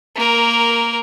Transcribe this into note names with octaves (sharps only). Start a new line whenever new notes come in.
A#3 A#4